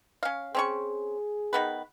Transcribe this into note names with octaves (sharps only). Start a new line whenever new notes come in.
C#4 F5
C4 C#4 G#4 C#6
D#3 B3 B4